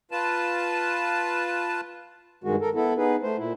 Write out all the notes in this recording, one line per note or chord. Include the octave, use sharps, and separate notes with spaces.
F4 B4 A5
G2 D#3 G#3 F#4
A4 A#4
B3 E4 A4
B3 D#4 G#4 B4
A3 C5
A#2 E4